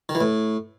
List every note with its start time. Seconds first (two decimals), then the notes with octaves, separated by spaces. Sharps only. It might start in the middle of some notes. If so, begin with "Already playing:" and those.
0.09 D#3
0.15 E3
0.21 A2